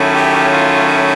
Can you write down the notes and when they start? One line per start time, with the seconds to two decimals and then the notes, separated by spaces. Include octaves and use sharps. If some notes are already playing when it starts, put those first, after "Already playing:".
Already playing: D#3 F#3 A3 C#4 E4
0.13 G4
0.52 F4